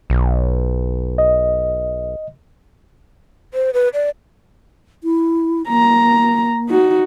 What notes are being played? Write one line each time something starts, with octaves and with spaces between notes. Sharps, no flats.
B1
D#5
C5
B4
D5
E4
A#3 A#5
D#4 F#4